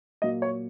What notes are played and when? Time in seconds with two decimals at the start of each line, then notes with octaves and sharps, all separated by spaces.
0.22 A#2 F#3 A#3 D#5
0.42 C#5